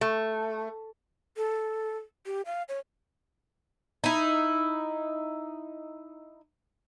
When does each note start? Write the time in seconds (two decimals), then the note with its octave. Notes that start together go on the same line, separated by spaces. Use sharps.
0.01 A3
1.37 A4
2.26 G4
2.46 F5
2.69 C#5
4.04 D#4 E4